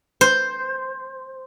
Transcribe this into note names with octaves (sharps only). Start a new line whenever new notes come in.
C5